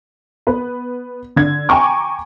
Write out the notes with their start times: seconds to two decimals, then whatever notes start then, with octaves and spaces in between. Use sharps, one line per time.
0.47 B3 B4
1.36 D3 G#6
1.69 G5 G#5 A#5 C#6 D6